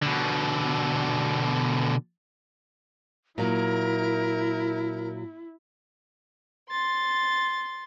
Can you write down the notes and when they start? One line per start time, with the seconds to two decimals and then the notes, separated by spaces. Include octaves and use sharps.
0.03 B2 D3
3.38 A#2 F#3 E4 A#4
6.69 C6 A6